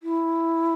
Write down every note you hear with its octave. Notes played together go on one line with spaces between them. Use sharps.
E4